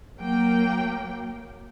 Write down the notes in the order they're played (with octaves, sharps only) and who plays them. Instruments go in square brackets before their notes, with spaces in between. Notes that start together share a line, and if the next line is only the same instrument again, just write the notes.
[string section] F#3 A#3 G5